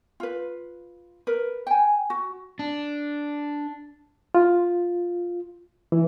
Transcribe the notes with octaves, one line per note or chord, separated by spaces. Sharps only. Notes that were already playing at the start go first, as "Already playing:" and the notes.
F4 B4
A#4 B4
G5 G#5
F#4
D4
F4
E3